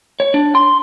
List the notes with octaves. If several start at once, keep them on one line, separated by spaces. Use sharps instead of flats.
C#5
D4
C6